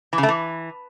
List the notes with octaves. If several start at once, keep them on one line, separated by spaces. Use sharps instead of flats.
E3
C#3
A3
E3